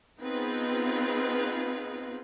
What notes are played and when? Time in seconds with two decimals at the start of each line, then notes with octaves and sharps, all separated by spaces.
0.21 B3 C4 D#4 F4 G#4 B4